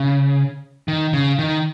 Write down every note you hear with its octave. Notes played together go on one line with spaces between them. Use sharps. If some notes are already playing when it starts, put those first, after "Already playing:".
Already playing: C#3
D#3
C#3
D#3